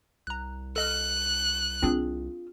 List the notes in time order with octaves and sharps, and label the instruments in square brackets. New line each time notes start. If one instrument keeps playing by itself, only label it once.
[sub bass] C2 [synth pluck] A#5 F#6
[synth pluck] A4 D#5 F6 [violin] F#6
[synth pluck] C4 D4 G#4 [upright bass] F4